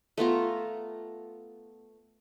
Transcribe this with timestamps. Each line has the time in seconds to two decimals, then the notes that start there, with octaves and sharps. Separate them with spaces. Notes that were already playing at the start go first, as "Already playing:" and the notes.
0.17 A3 B3 F4 A#5